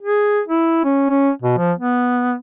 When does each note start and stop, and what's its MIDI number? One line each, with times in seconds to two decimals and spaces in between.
0.02 0.41 68
0.48 0.80 64
0.84 1.06 61
1.10 1.30 61
1.42 1.57 47
1.58 1.72 53
1.78 2.34 59